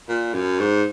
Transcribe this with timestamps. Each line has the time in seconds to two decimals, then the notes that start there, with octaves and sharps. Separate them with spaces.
0.08 A#2
0.34 F#2
0.60 G#2